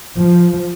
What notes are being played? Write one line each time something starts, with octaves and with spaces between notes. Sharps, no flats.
F3